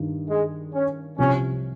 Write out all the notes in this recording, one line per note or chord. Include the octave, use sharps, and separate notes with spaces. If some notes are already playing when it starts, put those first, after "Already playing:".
Already playing: G2 D#3
G#3
C#4
C2 C3 F3 C#4